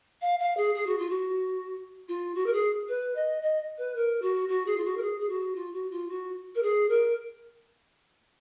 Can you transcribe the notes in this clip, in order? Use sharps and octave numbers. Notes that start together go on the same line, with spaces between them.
F5
F5
G#4
G#4
F#4
F4
F#4
F4
F#4
A#4
G#4
B4
D#5
D#5
B4
A#4
F#4
F#4
G#4
F4
F#4
A#4
G#4
G#4
F#4
F4
F#4
F4
F#4
A#4
G#4
A#4